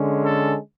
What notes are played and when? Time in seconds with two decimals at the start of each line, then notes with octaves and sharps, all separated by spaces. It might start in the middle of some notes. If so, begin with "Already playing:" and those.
Already playing: D3 G#3 C#4
0.24 A4